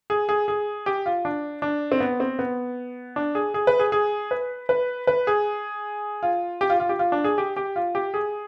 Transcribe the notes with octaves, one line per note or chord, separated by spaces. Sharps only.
G#4
G#4
G#4
G4
F4
D4
D4
C4
B3
C4
B3
D4
G#4
G#4
B4
G#4
G#4
B4
B4
B4
G#4
F4
G4
F4
F4
G4
F4
D4
G#4
G4
G4
F4
G4
G#4